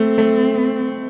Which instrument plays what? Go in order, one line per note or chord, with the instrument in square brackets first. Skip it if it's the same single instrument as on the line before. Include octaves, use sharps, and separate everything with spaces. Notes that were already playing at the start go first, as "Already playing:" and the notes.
Already playing: [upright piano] A3 [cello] C4
[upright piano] A3